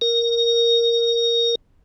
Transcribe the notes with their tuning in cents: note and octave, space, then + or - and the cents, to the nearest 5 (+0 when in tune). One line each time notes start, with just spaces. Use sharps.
A#4 +0